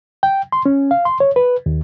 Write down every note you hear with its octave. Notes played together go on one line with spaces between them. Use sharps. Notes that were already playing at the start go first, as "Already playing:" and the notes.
G5
C6
C#4
F5
C6
C#5
B4
D#2